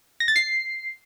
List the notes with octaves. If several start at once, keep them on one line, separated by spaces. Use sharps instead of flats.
A#6
A6
C7